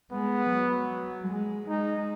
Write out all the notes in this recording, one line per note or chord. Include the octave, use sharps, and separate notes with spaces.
G#3 B3
F#3
G#3
G#3 D#4